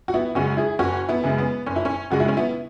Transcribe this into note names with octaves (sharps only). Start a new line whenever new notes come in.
F#4
B3 E4
F#2 C#3 G#3 C#4 F#4
E4 G#4
F#1 C#4 F#4
B3 E4
F#2 C#3 G#3
B3
F#1 C#4
E4
C#4
F#2 C#3 G#3 F#4
E4
C#4
B3 E4